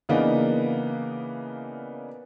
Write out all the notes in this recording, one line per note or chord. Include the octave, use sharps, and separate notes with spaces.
C#3 E3 A#3 B3 D4 D#4